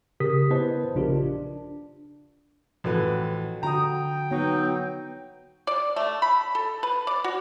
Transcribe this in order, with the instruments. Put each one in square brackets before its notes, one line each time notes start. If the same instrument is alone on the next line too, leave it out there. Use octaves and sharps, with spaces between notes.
[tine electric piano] C#3 G4 A#4 D#6 B6
B3 E4 B4 C5 D#5 A5
A#1 C#3 D4 F4 G4 A#4
D4
[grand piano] A1 B4 [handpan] F3 F#4 A4
[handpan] D3 F#4 [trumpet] G5 [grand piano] A#5 D#6
[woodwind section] F#3 D#4 [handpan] B3
[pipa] D5
A3
B5
A4
B4
D5
F#4